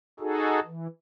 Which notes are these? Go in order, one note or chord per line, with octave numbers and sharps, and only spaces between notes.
D#4 F#4 G#4 A4
E3